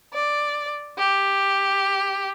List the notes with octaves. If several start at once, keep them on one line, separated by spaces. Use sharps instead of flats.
D5
G4